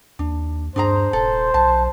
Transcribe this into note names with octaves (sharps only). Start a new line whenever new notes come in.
D#2 D4
G2 D4 G#4 C5 A#5
D#1 A4
B1 A5